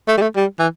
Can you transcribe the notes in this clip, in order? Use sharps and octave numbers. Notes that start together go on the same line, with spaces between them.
A3
G3
A3
G3
E3